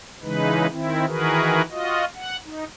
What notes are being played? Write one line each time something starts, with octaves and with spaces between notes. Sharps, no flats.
C#3 E3 G#3 D#4 B4
D#3 C4 E4
D#3 E3 F#4 G#4 A#4 B4
F4 F#4 D#5
F#5
D#4